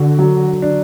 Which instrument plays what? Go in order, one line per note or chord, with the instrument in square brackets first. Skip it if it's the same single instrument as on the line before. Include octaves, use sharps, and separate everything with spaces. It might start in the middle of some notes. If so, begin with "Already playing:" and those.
Already playing: [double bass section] D3 [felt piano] F#4
[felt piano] F#3
D4